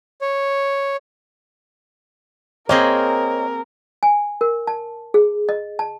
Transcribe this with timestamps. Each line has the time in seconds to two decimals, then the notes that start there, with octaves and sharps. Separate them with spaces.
0.22 C#5
2.69 A#3 C4 G#4 A#4 C5 C#5 D#5
4.03 G#5
4.41 A#4
4.67 A5
5.14 G#4
5.49 D#5
5.79 A5